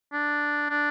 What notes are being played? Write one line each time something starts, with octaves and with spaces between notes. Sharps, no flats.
D4
D4